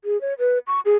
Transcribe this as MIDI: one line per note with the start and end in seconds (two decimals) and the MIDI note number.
0.05 0.20 68
0.21 0.34 73
0.39 0.58 71
0.67 0.80 85
0.85 0.96 68